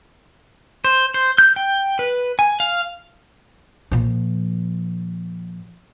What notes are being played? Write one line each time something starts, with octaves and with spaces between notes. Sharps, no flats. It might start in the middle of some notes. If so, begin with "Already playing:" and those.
C5
C5
G6
G5
B4
G#5
F5
A#2 F3